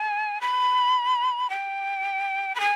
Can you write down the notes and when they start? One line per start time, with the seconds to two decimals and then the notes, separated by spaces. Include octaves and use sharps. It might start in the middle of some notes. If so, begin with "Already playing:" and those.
Already playing: G#5
0.41 B5
1.50 G5
2.55 B5
2.60 G#5